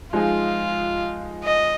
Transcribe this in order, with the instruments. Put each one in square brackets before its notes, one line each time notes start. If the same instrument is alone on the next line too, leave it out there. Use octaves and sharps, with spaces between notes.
[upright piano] F3 G#3 D#4 G#4 [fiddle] F4
[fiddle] D#5